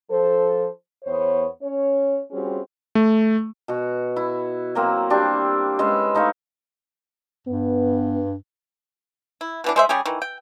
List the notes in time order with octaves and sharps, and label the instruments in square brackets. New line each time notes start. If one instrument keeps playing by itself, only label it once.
[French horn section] F3 A4 C5
E2 B3 C5 C#5
C#4 C#5
G3 C4 C#4 F4 F#4 G#4
[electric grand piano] A3
[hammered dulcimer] B2 F#4
E4
F#3 A#3 C4
G3 C4 D4 G4
G#3 C#4 B4 E5
A3 D#4 C#5 F5
[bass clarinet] G2 [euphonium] B3
[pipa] E4
B2 E3 D4
G#3 C5 E5
G3 C#4 G4 G#4
D#3 E3
G5